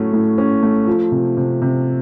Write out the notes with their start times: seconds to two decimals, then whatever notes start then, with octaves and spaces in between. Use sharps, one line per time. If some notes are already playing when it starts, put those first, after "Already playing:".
Already playing: A2 F#3 A3 C#4
0.13 A2
0.38 C#4
0.63 A3
0.87 F3
1.12 C3
1.37 C3
1.62 C3